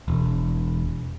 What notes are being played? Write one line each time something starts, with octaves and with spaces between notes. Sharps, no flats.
E1